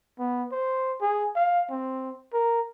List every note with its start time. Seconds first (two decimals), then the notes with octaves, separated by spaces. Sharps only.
0.19 B3
0.52 C5
1.01 G#4
1.36 F5
1.70 C4
2.33 A#4